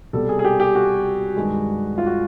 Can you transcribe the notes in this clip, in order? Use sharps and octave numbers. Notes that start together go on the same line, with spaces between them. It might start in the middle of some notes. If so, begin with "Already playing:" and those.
C2 B2 G3 A4
G#4
G#4
G4
G4
F#4
G2 D#3 G#3
F4
F#4